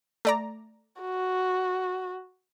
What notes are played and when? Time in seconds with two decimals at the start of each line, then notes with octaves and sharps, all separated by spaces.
0.25 A3 D5 A#5
1.02 F#4